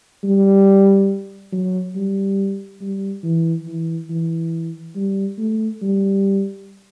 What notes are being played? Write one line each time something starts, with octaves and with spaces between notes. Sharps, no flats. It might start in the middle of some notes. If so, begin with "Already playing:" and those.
G3
F#3
G3
G3
E3
E3
E3
G3
A3
G3